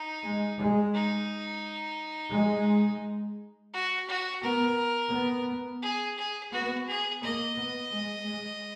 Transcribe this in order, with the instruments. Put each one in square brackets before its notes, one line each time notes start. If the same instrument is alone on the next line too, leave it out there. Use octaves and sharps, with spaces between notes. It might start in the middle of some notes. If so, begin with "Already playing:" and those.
Already playing: [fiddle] D#4
[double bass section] G#3
G#3
[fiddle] D#4
[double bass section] G#3
[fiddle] F#4
F#4
[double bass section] B3 [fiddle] A#4
[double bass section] B3
[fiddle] G#4
G#4
[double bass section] B3 [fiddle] F#4
[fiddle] G#4
[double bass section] A#3 [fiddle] D#5
[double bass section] B3
G#3
G#3